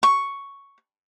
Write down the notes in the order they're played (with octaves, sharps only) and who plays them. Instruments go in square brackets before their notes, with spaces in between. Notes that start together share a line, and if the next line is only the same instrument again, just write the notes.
[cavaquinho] C#6